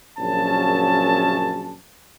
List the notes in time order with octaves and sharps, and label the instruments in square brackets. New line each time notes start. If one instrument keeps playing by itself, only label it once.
[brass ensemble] A#1 F#2 C#3 F#3 C#4 A5